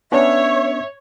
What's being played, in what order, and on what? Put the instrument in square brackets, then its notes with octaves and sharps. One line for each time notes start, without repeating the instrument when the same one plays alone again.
[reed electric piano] B3 C#4 D4 [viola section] C#5 [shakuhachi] E5